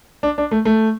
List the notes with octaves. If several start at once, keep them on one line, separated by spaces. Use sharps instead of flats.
D4
D4
A3
A3